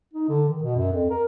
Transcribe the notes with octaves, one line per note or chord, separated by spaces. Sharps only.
D#4
D3
D#3
B2
F#2
F2
A#4